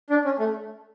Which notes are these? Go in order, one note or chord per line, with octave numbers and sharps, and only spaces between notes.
D4
C#4
A3